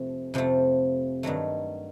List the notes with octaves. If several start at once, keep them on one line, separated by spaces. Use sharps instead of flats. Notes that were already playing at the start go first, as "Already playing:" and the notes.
Already playing: F2 C3 F3 A3
F2 C3 F3 A3
G2 D#3 F#3 A3